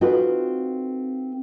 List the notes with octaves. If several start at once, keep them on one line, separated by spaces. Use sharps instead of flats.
C4 D#4 F4 F#4 A4 B4